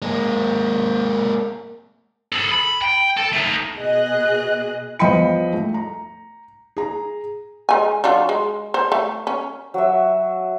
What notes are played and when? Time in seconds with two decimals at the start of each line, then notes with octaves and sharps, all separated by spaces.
0.02 G#3 A#3
2.32 G#4 A4
2.51 B5
2.82 G5
3.17 A4
3.33 A3 D#4
3.75 B2 G#4 D#5 F#6
4.99 E2 F3 D#5 G5 B5 C#7
5.53 A3
5.74 A#5
6.77 G#4 A#5
7.69 G#3 G#5
8.04 F#3 D4 F4
8.29 G#3
8.74 C5
8.92 A3
9.27 C#4
9.74 F#3 E5